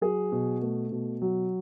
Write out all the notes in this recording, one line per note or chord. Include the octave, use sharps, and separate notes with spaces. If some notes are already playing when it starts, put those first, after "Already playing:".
F#3 G#4
B2
A3
B2
F#3